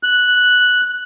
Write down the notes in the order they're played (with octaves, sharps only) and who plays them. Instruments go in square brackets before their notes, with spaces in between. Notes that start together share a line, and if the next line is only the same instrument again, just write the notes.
[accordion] F#6